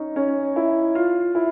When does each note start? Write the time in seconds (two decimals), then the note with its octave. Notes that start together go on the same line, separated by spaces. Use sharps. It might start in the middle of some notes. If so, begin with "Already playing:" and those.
Already playing: C#4 D#4
0.16 C#4
0.56 E4
0.95 F4
1.35 E4